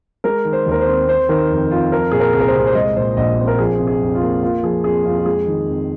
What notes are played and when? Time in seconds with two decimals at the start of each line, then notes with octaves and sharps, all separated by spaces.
0.24 G#3 A#4
0.45 D#3
0.53 C5
0.66 D#2
0.72 A#4
0.81 C5
0.87 C4
1.08 C4 C5
1.29 D#3 A#4
1.50 F2
1.70 F2 F4
1.92 F3 A#4
2.11 A#2 G#4
2.20 A#4
2.33 C2 G#4
2.40 A#4
2.48 C5
2.55 C2
2.67 C5
2.75 G#3 D#5
2.96 A#2 C5
3.17 A#1 D#5
3.38 C4
3.47 A#4
3.59 F3 G#4
3.80 C3
3.87 G#4
4.01 F2
4.15 F4
4.22 A#3
4.43 A#3 F4
4.63 F3 G#4
4.84 F2 G#4
5.05 F2 F4
5.18 F4
5.26 G#3 G#4
5.47 D#3
5.68 F2